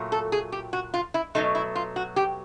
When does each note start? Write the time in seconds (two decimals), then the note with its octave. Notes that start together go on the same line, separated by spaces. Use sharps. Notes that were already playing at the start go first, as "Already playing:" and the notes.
Already playing: A#2 F#3 A3
0.12 A4
0.32 G#4
0.52 G4
0.73 F#4
0.94 F4
1.14 E4
1.35 B2 F#3 A3 D#4
1.55 E4
1.76 F4
1.96 F#4
2.16 G4